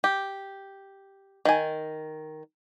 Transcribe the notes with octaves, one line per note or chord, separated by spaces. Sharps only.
G4
D#3 G#5